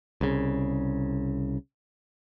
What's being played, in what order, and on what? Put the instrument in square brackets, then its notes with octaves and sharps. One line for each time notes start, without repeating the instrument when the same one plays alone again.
[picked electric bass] C2 C#3